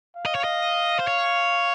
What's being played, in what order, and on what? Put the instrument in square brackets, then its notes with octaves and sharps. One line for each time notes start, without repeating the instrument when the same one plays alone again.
[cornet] F5
[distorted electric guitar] D#5
C#5
D#5
C5
C#5